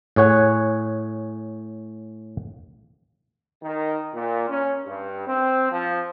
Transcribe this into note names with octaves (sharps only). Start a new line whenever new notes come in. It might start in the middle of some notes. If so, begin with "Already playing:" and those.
A2 G#4 C#5 F#5 G#5
D#3
A#2
C#4
G2
C4
F3